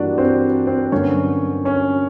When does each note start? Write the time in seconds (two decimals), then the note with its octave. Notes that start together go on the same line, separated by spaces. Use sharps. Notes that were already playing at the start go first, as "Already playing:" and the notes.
Already playing: G2 E3 G3 A#3 D4 F#4 D5
0.18 C4 C5
0.67 C4 C5
0.92 G2 D3 F#3 A#3 C#4 C#5
1.65 C#4 C#5